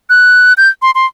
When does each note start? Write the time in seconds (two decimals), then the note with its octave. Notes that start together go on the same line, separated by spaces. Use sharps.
0.10 F#6
0.57 G6
0.82 C6
0.95 C6